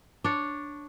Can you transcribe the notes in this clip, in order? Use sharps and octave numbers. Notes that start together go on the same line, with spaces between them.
D4 C#5